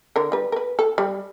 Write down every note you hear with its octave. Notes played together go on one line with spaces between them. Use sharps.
D3 A#4
G3 B4
A#4 B4
A4
G3